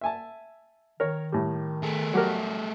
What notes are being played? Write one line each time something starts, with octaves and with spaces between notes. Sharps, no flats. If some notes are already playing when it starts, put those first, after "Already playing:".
E5 G#5 A5
D#3 A#4 C#5
A2 G3
A3 G#4
F#3 G4 A#4